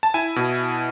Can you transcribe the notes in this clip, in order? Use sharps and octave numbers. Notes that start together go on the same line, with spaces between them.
A5
E4 G#5
B2